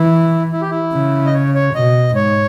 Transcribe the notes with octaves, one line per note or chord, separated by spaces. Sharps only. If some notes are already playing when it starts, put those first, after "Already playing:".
Already playing: E3 E4
E4
G4
E4
C#3
D#5
C#5
C#5
B2 D#5
G#2 C#5